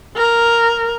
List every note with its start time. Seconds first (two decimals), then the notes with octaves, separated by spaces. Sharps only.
0.16 A#4